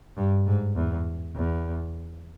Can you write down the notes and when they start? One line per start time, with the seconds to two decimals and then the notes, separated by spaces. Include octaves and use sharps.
0.17 G2
0.47 G#2
0.75 E2
1.35 E2